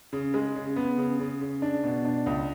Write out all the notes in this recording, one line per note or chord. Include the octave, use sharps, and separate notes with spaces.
C#3
G#3
C#3
B3
C#3
C#3
C#3
D4
B2
D4
C#2